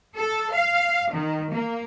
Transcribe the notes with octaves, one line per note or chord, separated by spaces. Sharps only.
A4
F5
D#3
A#3